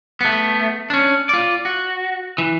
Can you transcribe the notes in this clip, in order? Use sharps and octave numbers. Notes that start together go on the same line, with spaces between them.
A3 B3
C#4 D4
F4 D5
F#4
E3